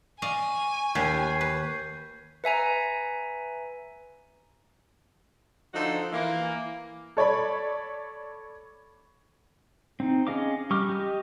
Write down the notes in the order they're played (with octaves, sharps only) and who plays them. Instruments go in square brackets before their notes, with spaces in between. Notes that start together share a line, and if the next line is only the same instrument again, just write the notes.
[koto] D5 D#5 F5 [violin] G#5 [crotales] C#6
[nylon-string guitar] D#2 [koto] D4 G4 D5 [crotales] G6 G#6 C7
[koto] B4
[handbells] B4 E5 G#5 A#5
[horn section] D3 F3 D#4 F#4 A4 C5
E3 A#3
[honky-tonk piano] A4 C#5 D5 B5
[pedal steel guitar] C4 D#4
C#4 G#4 D#5 F5 D6
G3 C#6 D6 F6
G4 D#5